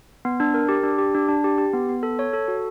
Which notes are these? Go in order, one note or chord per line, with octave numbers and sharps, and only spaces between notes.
B3
D4
A#4
G4
D4
G4
D4
D4
G4
G4
B3
B3
A4
C#5
A4
F#4